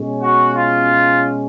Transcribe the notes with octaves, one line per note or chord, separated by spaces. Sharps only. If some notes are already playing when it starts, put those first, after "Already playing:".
Already playing: B2 G#3 C#4
F#4
F4